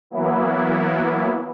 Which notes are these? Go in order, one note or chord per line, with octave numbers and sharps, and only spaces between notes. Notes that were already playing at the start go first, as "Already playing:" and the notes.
E3 F#3 A#3 B3 E4